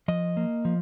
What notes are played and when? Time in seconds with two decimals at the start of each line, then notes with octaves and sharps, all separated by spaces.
0.08 F3 D#5
0.37 A#3
0.65 F3